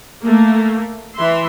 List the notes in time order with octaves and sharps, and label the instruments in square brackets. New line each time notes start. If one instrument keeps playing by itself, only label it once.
[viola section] A3 A#3
E3 E5 C6